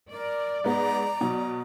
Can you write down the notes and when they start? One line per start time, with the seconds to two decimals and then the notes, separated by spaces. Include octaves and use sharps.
0.11 A#4 D5
0.64 G#2 B3 A#5
1.21 B2 F#3